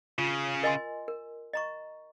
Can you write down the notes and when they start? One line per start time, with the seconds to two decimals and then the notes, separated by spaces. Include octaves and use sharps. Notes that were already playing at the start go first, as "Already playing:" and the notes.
0.18 C#3 F4
0.63 A#4 D#5 G#5 C6
1.08 A#4
1.53 D#5 A#5 C#6